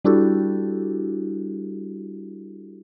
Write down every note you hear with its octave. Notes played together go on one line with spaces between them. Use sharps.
G3 D4 E4 F#4 G4 A4